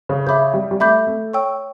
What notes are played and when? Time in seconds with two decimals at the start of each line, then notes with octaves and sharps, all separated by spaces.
0.09 C#3
0.27 C#3 E5 B5 D6 G6
0.54 G3
0.71 G3
0.80 A3 E5 B5 D6 G6
1.07 A3
1.33 C#5 G5 C#6 E6